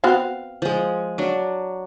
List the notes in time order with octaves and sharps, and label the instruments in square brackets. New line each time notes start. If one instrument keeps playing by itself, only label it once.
[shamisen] B3 C4 F#4 [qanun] F5
[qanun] F3 G#3
F#3 D4